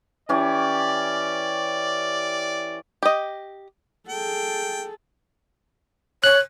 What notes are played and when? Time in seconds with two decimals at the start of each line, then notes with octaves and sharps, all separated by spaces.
0.29 E3 C#4 G4 D5
3.03 G4 D#5
4.09 G#4 A4 G5
6.24 C#5 F#6